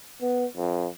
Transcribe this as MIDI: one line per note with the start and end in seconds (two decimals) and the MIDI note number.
0.22 0.45 59
0.56 0.88 41